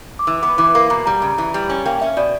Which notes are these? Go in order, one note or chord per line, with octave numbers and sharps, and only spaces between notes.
D6
E3 E6
B3 D6
E3 D6
A#3 D6
B2 A#5
G3 A#5
C#3
E3
G3
C#4
A#3 G5
C#4 E5
B2 D5